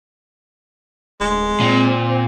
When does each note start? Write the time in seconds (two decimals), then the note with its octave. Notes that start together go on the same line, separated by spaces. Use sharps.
1.20 D1 G#3
1.60 A#2 C4